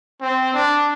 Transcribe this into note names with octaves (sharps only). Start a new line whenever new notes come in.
C4
D4